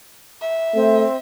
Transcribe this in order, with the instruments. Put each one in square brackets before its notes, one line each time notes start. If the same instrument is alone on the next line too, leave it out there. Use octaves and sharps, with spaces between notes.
[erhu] E5
[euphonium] A3 [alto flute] C4